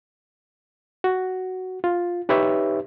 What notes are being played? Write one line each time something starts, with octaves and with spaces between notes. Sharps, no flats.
F#4
F4
D#4 G4 B4 C#5 E5